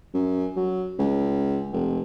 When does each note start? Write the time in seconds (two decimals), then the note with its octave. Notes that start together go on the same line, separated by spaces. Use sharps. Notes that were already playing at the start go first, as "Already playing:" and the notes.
0.14 F#2
0.56 F#3
0.99 C#2
1.73 F1